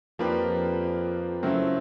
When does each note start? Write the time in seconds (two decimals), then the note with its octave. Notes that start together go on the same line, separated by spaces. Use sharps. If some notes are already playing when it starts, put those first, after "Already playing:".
0.19 F2 F3 A#3 D4 G4 B4
1.43 F#2 C#3 F#3 A3 C4 E4